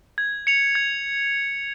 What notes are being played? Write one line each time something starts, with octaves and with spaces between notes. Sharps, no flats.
G#6
C#7 F7
G#6